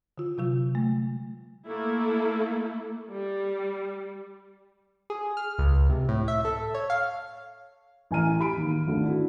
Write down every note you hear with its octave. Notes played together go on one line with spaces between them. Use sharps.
D3 F4
C3 F#3 F4
G#3 A3
A3 A#3 E4 A4
G3
G#4
F6
C#2
C3
A2
E5
A4
C#5
F5
A1 A2 G#5 A#5 F6 D#7
G4 B5 D7
D#2
G#1 D3 A3
D4 E4 F#4